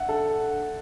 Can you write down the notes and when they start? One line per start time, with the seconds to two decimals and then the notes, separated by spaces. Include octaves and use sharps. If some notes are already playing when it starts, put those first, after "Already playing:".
Already playing: E5 F#5
0.09 A4